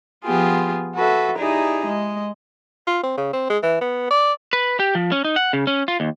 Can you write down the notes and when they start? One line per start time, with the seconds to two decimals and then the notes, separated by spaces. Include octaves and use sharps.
0.25 F3 B3 F4 G4 G#4
0.95 F#4 A4 B4 E5
1.37 D#4 E4 G4 G#4 D5 A#5
1.85 G#3 D#5
2.87 F4
3.03 C4
3.17 C#3
3.33 C4
3.50 G#3
3.63 E3
3.81 B3
4.10 D5
4.53 B4
4.80 G4
4.95 F3
5.12 C#4
5.25 D#4
5.36 F#5
5.53 C#3
5.67 C#4
5.88 F4
6.00 D#2